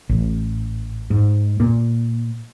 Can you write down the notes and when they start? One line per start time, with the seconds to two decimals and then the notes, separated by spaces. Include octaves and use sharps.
0.09 A1
1.10 G#2
1.60 A#2